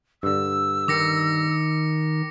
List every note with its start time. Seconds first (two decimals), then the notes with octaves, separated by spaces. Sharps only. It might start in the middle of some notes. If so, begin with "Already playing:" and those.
0.23 G2 D3 E6
0.88 D#3 D6 A#6 C#7